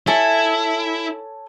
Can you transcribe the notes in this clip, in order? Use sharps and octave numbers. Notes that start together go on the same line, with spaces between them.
E4 A4 C#5 G#5